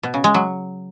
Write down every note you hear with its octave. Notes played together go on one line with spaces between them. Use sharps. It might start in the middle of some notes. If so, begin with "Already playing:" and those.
B2
C#3
G#3
F#3